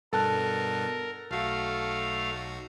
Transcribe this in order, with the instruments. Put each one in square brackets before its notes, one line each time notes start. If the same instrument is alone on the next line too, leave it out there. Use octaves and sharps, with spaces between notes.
[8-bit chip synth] G2 B2 B3 [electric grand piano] A4 A5 F#6 [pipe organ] A#4
[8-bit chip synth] B1 F#4 [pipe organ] A3 F5